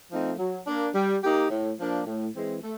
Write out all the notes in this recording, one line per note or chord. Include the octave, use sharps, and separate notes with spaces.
F3 A3 C4 D#4
F#3
A#3 D4
G3
A#3 D#4 G4
A2
F3 A#3 D4
A2
E3 G#3 C4
A3